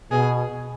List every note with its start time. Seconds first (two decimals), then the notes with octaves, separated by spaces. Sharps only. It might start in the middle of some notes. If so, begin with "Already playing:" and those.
0.11 B2 G#4